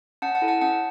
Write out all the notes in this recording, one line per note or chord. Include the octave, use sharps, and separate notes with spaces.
C#4 F#5 A5
F#5 A5
E4 A4
F#5 A5
C#4 F#5 A5